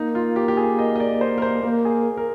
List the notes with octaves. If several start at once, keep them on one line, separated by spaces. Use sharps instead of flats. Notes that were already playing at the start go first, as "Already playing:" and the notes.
Already playing: A#3 D#4
F4
G4
G4
G#4
D#5
D#5
D5
C5
A#4
C5
A#3 A#4
G#4
A#4